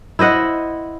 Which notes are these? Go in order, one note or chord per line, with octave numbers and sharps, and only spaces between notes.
E4 C5 D#5 F#5